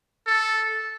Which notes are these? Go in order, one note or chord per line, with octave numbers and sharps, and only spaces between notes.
A4